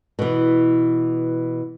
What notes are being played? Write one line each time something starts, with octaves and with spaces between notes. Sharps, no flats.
B2 E3